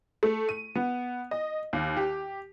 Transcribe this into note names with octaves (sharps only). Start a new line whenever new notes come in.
A3
D#7
B3
D#5
D#2
G4